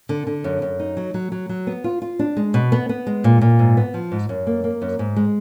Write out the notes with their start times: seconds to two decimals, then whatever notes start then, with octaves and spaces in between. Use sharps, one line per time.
0.09 D3
0.27 D3
0.44 F#2
0.62 F#2
0.80 D#4
0.97 F#3
1.14 F#3
1.32 F#3
1.49 F#3
1.67 B3
1.84 F4
2.02 F4
2.19 D4
2.37 G#3
2.54 B2
2.72 B3
2.89 B3
3.07 G#3
3.24 A#2
3.41 A#2
3.59 G#2
3.77 B3
3.94 F3
4.12 G#2
4.29 F#2
4.47 A#3
4.64 A#3
4.82 F#2
4.99 G#2
5.16 G#3